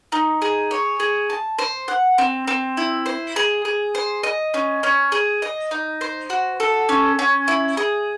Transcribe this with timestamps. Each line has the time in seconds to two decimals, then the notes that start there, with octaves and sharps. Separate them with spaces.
0.12 D#4
0.42 G#4
0.71 C#5
1.00 G#4
1.30 A5
1.59 C5
1.88 F#5
2.18 C4
2.48 C4
2.77 E4
3.06 C5
3.36 G#4
3.65 G#4
3.95 C5
4.23 D#5
4.54 C#4
4.83 C#4
5.12 G#4
5.42 D#5
5.71 D#4
6.01 C5
6.30 F#4
6.60 A4
6.89 C#4
7.19 C#4
7.48 E4
7.77 G#4